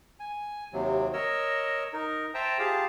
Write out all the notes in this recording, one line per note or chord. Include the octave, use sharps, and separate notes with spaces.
G#5
D#2 C3 F#3
A#4 C#5 D#5 E6
D#4 A#4
C5 E5 G5 A5 A#5
F4 G4 G#4 F5 A5